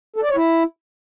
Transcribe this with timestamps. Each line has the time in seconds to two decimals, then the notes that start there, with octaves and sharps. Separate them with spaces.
0.16 A4
0.23 D5
0.29 C#5
0.36 E4